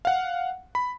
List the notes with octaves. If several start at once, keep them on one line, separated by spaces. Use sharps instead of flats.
F5 F#5
B5